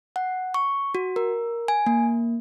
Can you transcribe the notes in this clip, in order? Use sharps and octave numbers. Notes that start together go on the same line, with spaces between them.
F#5
C#6
F#4
A#4
G#5
A#3